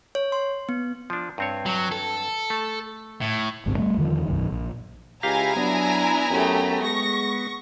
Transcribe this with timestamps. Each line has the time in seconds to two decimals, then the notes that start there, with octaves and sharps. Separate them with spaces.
0.15 C#5
0.32 C6
0.69 B3
1.10 F3 D4
1.38 G2 C4 C#5
1.66 F#3
1.92 A4
2.50 A3
3.21 A2
3.66 G1 C2 G#2 C3
3.78 G3 A3
3.97 E2 D3 D#3 F3
4.26 B1 F#2 D#3
4.51 A#1
5.23 C#2 E4 G4 F5 G#5 A#5
5.57 F#3 B3 D4
6.30 F#2 A3 G4
6.83 G#3 C#6 A#6